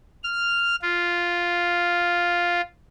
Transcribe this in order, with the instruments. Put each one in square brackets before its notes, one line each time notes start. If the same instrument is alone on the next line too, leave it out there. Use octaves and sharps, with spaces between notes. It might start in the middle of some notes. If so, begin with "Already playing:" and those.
[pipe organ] F6
F4